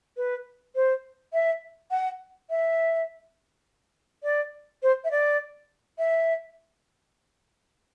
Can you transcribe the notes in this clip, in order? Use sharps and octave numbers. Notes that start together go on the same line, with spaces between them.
B4
C5
E5
F#5
E5
D5
C5
E5
D5
E5